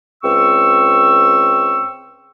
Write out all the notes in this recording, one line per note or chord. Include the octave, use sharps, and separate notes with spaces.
C#2 C4 C#6 E6